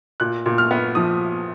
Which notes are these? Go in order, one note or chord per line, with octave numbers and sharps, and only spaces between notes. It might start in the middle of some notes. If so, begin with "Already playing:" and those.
A#2 F#6
A#2
F6
B3
F3 D#6